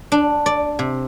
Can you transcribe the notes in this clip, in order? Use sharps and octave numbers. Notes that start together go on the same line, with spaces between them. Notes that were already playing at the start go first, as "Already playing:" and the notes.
D4
D5
C3